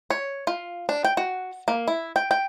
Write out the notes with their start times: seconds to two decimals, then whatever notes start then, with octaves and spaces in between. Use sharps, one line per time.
0.10 C#5
0.47 F4
0.89 D4
1.05 G5
1.17 F#4
1.68 A#3
1.88 E4
2.16 G5
2.31 G5